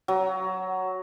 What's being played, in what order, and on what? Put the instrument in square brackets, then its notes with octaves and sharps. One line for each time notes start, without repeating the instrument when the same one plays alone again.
[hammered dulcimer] F#3